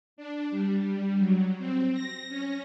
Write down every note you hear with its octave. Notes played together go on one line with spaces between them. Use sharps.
D4
G3
G3
F#3
C4
A#6
C#4